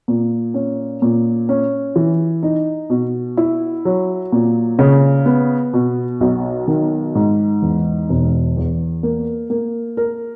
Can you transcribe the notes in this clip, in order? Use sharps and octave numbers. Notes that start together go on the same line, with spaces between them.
A#2
C#4
A#2
C#4
E3
D#4
B2
E4
F#3
A#2
C#3
B3
B2
B1
D#3
G#2
E2
E1
E2
A#3
A#3
A#4